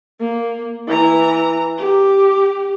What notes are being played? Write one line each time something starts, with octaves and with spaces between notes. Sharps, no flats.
A#3
E3 A#5
G4